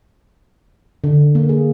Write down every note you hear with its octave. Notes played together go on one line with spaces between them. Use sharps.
D3
A#3
G#4